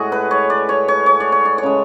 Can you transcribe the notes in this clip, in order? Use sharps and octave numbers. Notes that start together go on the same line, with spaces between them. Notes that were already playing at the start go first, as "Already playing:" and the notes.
Already playing: A2 G#3 F#4 G#4
B4
C#5
D5
C#5
C#5
C#5
D5
C#5
D5
C#5
C#3 G#3